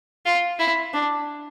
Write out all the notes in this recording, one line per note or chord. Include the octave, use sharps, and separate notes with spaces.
F4
E4
D4